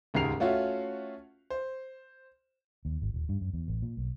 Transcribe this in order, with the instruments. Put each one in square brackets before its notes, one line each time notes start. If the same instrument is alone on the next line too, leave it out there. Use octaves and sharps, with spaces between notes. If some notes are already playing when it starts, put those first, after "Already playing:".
[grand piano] D#1 C#2 G#2 A#4 C7 F7
A3 C#4 F4 F#4 E5 F5
C5
[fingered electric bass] D#2
G#1
D#1
G2
F#2
E2
A1
A#2
B1